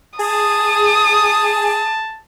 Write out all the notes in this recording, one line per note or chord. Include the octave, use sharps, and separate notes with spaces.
G#4 A5 D#6